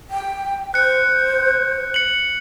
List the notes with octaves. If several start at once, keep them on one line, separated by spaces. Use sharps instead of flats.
G5
C5 F#6 C#7
C#7 F#7